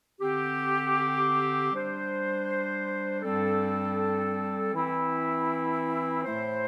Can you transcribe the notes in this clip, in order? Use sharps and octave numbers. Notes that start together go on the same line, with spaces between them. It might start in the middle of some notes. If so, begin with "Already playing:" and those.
D3 C4 G4
G3 D4 C5
G2 G3 C4 A4
E3 C4 E4
A2 A3 E4 C5